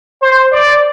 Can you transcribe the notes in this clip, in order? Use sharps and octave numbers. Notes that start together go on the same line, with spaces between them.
C5
D5